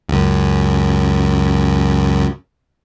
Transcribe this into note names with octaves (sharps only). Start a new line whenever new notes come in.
C#2 F#2